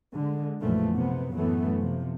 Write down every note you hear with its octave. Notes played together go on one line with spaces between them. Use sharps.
D3 G#3
B1 F#2 A#2 E3 F3 A3
C3 B3
F#2 A2 E3 A3 B3
C3 F3